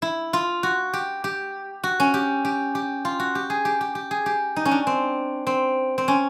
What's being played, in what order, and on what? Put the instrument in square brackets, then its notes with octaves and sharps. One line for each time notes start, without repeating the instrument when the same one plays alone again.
[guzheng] E4
F4
F#4
G4
G4
F#4
C#4
G4
G4
G4
F4
F#4
G4
G#4
G4
G4
G4
G#4
G4
D#4
C#4
D4
C4
C4
C4
C#4